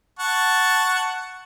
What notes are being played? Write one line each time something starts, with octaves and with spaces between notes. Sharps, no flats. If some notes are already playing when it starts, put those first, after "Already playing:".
F#5 A5 C#6